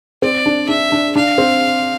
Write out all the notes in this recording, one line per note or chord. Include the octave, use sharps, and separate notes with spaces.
C4 D5
D4
D4 E5
D4
D4 F5
C4